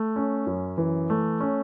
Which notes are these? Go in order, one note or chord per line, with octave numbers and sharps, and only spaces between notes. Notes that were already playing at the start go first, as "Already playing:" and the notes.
Already playing: A3
C#4
F#2
E3
A3
C#4